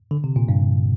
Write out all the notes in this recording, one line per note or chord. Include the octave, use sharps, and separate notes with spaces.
D3
C3
A#2
G2